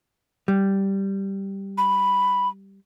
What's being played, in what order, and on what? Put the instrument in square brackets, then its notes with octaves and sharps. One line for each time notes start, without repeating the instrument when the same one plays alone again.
[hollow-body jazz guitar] G3
[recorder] B5